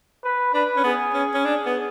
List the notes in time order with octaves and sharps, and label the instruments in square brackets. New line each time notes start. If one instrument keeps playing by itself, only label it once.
[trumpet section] B4
[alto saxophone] D4 [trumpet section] B4
[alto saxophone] C#4
[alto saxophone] B3 [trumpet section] G#4
[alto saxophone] C#4
C#4
D4
B3